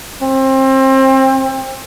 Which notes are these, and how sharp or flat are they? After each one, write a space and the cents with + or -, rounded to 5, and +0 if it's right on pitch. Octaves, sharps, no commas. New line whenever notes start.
C4 +30